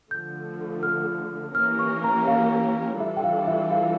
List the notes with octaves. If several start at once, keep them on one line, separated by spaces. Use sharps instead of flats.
D3 F3 A3 G6
F6
E3 A#3 C#4 G4 A#4 F6
C#6
A#5
F5
E3 G3 D4 F4 A4 E5
G5
F5
E5
F5